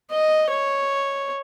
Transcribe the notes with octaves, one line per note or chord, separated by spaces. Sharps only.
D#5
C#5